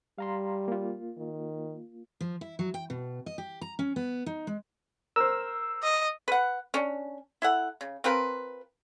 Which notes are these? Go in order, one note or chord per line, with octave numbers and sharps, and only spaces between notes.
G3 F5 A#5 C6
A#3 F4
D#3
F3
E4
F#3
G5
B2
D#5
G4
A#5
C#4
B3
D#4
G#3
A#4 C5 E6
D#5
B4 F#5
C#4 D4
E4 A4 F#5
C#3
C4 F4 A#4 B4